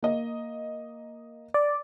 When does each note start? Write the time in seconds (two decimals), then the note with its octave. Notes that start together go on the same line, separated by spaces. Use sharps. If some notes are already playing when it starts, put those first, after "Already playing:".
0.03 A#3 D#5
1.54 D5